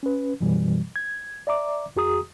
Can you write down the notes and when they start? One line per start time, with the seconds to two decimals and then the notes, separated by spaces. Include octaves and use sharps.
0.03 C#4 B4
0.41 F#2 B2 E3 G3
0.96 G#6
1.47 D5 E5 A#5 D6
1.96 F2 F#4 G#4 A#5 D#6